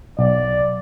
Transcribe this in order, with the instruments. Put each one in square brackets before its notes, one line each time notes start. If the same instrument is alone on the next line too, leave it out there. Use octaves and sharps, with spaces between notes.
[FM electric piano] B1 [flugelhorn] D5